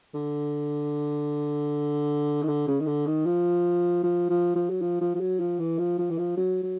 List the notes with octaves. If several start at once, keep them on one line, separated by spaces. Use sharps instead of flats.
D3
D#3
D3
C#3
D#3
D3
D#3
F3
F3
F3
F3
F#3
F3
F3
F3
F#3
F3
E3
F3
F3
E3
F3
F#3
F#3